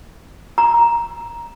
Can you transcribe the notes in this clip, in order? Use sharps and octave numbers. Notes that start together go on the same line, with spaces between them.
A#5